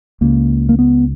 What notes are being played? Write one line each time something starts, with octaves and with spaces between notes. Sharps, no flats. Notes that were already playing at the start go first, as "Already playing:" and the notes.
C#2 C#3 A#3
A#3
B3